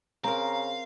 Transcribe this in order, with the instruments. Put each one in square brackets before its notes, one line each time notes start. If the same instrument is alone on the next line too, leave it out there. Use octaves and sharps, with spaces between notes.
[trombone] C#3 [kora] C4 A#4 [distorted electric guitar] F5 [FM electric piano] A#5